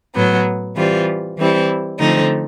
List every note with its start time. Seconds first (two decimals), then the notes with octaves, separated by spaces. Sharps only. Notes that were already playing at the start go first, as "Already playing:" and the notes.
0.14 A2 F#3 B3
0.76 E3 G3 C4 F4
1.37 E3 G3 C4 E4
1.99 D3 F3 A3 C4 D#4